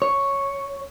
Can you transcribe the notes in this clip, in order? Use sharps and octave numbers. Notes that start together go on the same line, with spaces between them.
C#5